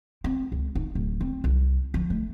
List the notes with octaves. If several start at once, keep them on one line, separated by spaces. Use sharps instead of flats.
C4
C#2
D#4
D1
C4
C2
F3
A3